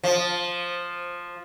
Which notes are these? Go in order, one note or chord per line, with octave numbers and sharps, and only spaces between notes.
F3